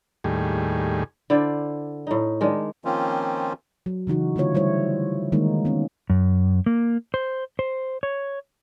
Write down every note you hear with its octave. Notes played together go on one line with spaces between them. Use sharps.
D#2 A2 G3 G#4
D3 E4 C5 D5
A2 D#4
D#3 G#3 D4
D#3 F3 A#3 C4 C#4 F4
F#3
C#3 E3 D#4 F#4
D3 A3 E4 F4 C#5
G3 E4 C5 C#5
D#3 G#3 A#3 D#4
B3 C#4
F#2
A#3
C5
C5
C#5